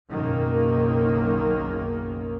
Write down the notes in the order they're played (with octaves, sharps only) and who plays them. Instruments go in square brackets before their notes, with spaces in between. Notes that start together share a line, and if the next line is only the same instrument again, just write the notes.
[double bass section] F#1 B1 F#2 D#3 A#3